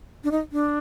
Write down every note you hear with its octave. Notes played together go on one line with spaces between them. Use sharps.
D4
D#4
D4